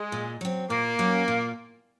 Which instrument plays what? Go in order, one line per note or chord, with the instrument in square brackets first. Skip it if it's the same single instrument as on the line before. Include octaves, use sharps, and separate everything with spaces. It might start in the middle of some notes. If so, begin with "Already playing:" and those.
Already playing: [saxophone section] G#3
[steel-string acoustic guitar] A#2
F#3 C4
[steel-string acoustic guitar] A#2 [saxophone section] A#3
[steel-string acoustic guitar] F#3 C#4
A#2